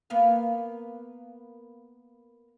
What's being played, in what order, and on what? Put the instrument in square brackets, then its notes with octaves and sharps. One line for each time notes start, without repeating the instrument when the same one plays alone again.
[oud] A#3 B3 F5